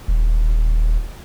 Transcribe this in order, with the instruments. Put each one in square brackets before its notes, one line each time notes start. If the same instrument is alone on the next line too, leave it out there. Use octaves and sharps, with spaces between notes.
[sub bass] D#1